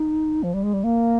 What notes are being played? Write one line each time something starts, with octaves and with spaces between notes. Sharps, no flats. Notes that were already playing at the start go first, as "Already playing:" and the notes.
Already playing: D#4
F3
G3
G#3
G3
A#3